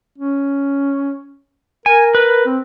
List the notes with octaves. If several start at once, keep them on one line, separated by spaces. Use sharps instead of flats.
C#4
A#4 G#5
B4
C4